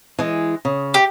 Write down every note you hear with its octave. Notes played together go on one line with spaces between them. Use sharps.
E3 G#3
C#3
G4